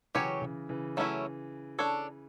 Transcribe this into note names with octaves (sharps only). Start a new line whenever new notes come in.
C#3 E3 F#3 C#4 G4 C#5
C#3 E3
C#3 E3
F#3 A3 C#4 E4
D4 A4 C#5